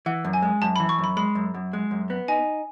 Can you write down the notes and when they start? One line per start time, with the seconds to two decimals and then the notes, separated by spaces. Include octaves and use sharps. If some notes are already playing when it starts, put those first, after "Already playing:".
0.06 E3 F#5
0.25 F#2
0.33 G#5
0.42 G#3
0.62 F#2 A5
0.76 E3 B5
0.89 C#6
0.99 F#2
1.04 B5
1.17 G#3 B5
1.35 F#2
1.54 F#2
1.73 G#3
1.91 F#2
2.10 B3
2.28 D#4 G#5